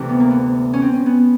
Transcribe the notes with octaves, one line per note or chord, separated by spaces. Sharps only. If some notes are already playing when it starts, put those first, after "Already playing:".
Already playing: D2 C3 E3
B3
A#3
B3
C#4
C4
C#4
B3